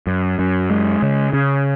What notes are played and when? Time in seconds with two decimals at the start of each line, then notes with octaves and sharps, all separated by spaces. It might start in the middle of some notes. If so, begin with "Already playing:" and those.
0.07 F#2
0.39 F#2
0.70 G#3
1.02 C#3
1.33 C#3